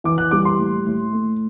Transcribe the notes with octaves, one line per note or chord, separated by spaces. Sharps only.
E3 D6
F#6
G3 D6
C6
A2
A2
A3